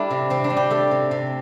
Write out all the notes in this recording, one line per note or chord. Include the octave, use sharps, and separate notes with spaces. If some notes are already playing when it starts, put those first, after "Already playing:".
Already playing: G3 D4 E4 G4 A4
C3
C3 C4
D4
G3
G4
A3 A4
C3
C3